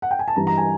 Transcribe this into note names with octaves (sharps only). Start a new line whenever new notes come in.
F#5
G5
G#5
A5
G2 E3 G3 A#5
A#5
G#5